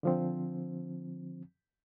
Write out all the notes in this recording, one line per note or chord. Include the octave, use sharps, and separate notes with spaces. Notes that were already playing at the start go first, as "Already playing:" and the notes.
D3 F3 C4